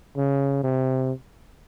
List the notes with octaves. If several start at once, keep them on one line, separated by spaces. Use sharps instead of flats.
C#3
C3